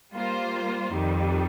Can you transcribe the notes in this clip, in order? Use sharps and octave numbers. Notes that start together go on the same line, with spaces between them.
G3 A#3 F4 C5
F2 D#3 G3